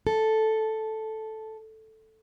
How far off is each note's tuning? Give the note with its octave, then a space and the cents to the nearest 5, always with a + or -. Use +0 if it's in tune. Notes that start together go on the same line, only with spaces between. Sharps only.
A4 -5